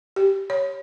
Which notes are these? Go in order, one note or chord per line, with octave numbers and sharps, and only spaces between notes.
G4
C#5